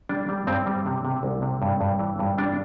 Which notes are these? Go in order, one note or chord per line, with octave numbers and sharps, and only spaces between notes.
G3 D4
G3
G2 C4
G3
C3
C3
C2
C3
G2
G2
E3
G2
G3 D4